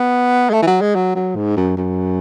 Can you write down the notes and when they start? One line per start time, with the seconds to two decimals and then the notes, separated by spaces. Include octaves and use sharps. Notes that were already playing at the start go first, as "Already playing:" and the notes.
Already playing: B3
0.50 G#3
0.53 A3
0.62 E3
0.67 F#3
0.81 G#3
0.95 F#3
1.15 F#3
1.36 G#2
1.57 F#2
1.77 F#2